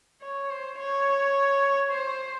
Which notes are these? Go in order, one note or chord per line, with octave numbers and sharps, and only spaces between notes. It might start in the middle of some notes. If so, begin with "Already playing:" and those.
C#5
C5
C#5
C5